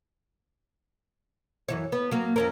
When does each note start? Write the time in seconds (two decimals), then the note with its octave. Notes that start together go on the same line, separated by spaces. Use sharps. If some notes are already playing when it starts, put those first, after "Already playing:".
1.68 F#2 E3 C#5
1.92 B3
2.11 F#3 A#3
2.36 F2 C#4 A#4